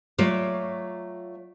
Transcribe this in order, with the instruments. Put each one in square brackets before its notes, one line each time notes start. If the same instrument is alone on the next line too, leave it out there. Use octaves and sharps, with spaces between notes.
[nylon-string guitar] F#3 A3 F4 C#5 D5